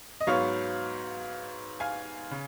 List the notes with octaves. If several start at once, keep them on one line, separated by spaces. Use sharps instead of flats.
D#5
G#2 F#3 B3 C#5 F5
F5 G#5
C#3